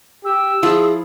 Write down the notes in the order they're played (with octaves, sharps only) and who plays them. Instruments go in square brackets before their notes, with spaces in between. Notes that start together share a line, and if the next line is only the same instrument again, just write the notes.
[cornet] G4 [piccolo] E6
[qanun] F3 [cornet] E4 [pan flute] G#4